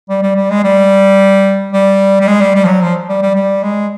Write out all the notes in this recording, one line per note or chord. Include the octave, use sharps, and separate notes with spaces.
G3
G3
G3
G#3
G3
G3
G3
G#3
G3
G3
F3
F#3
F3
G3
G3
G3
G#3